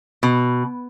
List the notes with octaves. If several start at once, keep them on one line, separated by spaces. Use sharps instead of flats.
B2